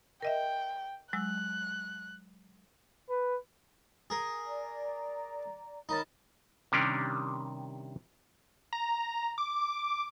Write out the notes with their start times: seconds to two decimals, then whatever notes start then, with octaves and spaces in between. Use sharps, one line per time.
0.22 A#4 D#5 E5 G5
1.13 F#3 G#3 E6 F#6
3.10 B4
4.10 G#4 A#4
4.46 D5 A#5
5.89 D#4 A#4 C#5 A5 B5
6.72 C3 D#3 G3 C#4 D4 A#4
8.73 A#5
9.38 D6